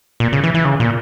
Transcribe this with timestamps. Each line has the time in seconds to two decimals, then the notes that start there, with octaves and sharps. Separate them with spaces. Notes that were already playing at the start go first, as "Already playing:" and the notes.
0.20 A#2
0.33 C#3
0.44 E3
0.54 E3
0.65 C#3
0.80 A#2